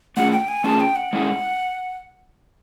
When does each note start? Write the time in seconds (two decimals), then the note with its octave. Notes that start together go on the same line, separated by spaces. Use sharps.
0.16 A3 C#4 F4 G#4 F#5
0.32 G5
0.48 G#5
0.64 A3 C#4 F4 G#4 A5
0.80 G5
0.96 F#5
1.13 G#3 C#4 E4 G#4